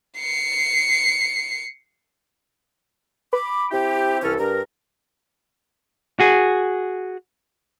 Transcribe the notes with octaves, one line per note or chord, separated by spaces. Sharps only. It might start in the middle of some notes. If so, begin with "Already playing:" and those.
C7 C#7
B5 D6
C4 E4 G4
C2 E3 C#4 A4 F6
G2 A#4
F#4 G#4